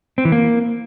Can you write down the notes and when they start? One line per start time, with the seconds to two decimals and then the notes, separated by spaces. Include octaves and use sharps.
0.18 C4
0.25 E3
0.32 A#3